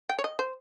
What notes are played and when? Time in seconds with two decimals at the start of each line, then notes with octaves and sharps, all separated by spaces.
0.09 G5
0.19 C#5
0.24 D#5
0.39 C5